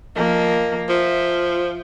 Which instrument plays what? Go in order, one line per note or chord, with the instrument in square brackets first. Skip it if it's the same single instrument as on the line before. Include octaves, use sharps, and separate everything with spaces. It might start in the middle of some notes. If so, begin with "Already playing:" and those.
[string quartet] F3 A#3 D#5
[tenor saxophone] F3 [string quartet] E5